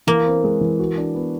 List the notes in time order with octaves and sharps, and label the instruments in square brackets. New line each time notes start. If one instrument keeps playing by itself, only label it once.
[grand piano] E3 [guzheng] A#3
[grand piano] C4
G#3
E3
F#4
D4
B3